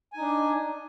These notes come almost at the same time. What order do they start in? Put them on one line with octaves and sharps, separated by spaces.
G#5 D#4 D4